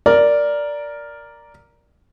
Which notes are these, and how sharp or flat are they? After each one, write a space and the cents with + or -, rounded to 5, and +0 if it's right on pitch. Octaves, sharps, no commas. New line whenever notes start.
A#4 +0 D5 -5